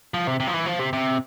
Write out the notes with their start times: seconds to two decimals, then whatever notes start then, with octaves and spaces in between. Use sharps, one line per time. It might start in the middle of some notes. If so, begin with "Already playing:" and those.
0.14 F3
0.27 C3
0.40 C3
0.47 F3
0.54 E3
0.66 F3
0.79 C3
0.93 C3